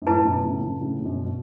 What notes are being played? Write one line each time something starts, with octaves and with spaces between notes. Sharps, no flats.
F#2
A2 E4 B4 A5
F#2 B2
A2 C#3
A2 C#3
A2 C#3
C#3
F#2 B2
B2